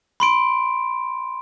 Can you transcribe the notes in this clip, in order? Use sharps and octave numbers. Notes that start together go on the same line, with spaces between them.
B5 C6 D7